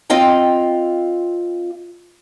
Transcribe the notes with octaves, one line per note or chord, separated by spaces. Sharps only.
C4 F4 D#5 F5 G5